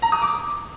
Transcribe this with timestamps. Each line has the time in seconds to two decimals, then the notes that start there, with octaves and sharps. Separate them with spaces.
0.02 A#5
0.12 D#6
0.22 D6